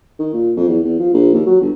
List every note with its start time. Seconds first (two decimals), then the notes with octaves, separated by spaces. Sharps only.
0.20 D#3
0.34 A#2
0.56 F2
0.68 E2
0.85 E2
0.99 F3
1.13 A#1
1.33 D#2
1.46 F#3
1.61 G1